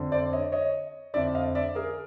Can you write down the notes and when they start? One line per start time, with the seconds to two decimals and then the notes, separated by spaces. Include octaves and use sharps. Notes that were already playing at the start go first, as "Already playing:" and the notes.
Already playing: F2 D3
0.12 C5 D5
0.33 C#5 D#5
0.52 C#5 D#5
1.14 F2 D3 D5 E5
1.35 D#5 F5
1.55 D5 E5
1.75 G#4 A#4